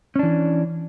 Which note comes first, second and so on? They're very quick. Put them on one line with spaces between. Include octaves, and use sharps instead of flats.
C#4 D4 E3